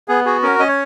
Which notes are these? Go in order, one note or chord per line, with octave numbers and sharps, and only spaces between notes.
B3 G#4
F#4 G#4
C#4 A#4
C#4 D#5
C#5